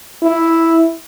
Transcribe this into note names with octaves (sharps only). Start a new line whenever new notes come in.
E4